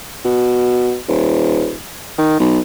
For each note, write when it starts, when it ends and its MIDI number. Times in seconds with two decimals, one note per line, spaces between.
0.25 0.97 47
1.08 1.74 27
2.18 2.39 51
2.40 2.60 35